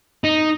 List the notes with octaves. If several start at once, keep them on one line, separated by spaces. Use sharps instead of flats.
D#4